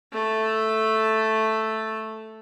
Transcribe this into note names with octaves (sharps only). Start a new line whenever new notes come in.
A3 A4